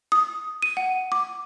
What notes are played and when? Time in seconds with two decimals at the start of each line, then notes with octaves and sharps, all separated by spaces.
0.12 D#6
0.62 D#7
0.77 F#5
1.12 D6